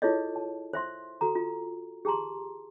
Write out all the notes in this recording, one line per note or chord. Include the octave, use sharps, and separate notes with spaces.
E4 F4 G#4 A4 C#5 D#5
A5
C5 E5 C6
F#4 A4 A#5
F4
G4 G#4 A5 A#5 C6